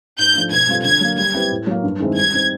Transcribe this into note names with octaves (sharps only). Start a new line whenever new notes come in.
G#2 G6
F3 A3 D4 F4
B2 G#6
G3 C4 F4 A4
D3 G#6
F#3 A#3
G3 G#6
C4 E4 G4 B4
A2
F#3 A#3
G2
D#3 G#3 C4 E4
G3 G#6
C4 D#4